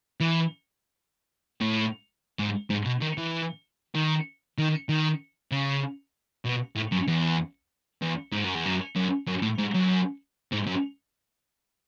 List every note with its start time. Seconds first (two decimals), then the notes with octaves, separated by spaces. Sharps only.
0.20 E3
1.61 A2
2.39 G#2
2.70 G#2
2.86 B2
3.01 D#3
3.18 E3
3.95 D#3
4.58 D#3
4.89 D#3
5.51 C#3
6.45 B2
6.77 A2
6.92 F#2
7.07 E2
8.02 E2
8.32 G#2
8.44 F#2
8.55 E2
8.66 F#2
8.96 F#2
9.27 F#2
9.42 A2
9.58 G#2
9.74 F#2
10.52 G#2
10.67 F#2